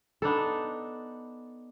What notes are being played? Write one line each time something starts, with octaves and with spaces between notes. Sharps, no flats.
B3 D4 D#4 A4